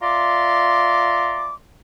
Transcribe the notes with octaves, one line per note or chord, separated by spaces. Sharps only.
F4 D5 E5 A#5 C6 D6